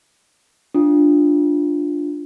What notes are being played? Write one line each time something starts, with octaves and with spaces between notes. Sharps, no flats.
D4 F4